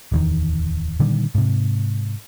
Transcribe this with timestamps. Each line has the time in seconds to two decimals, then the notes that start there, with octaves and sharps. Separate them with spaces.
0.12 D1 E2 D#3
1.00 A#2 D3 D#3 G3
1.35 G#2 C3